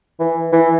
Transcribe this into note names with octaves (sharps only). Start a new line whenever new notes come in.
E3
E3